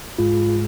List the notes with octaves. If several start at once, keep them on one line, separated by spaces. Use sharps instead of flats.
G#2 G#3 F4